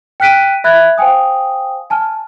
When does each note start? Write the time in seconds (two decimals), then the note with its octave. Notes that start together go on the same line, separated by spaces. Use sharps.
0.20 G5 F6 F#6 B6 D7 D#7
0.64 E5 B5 F#6 G#6 A6
0.98 C5 F5 G5 G#5 D#6
1.90 G#5 A5 F6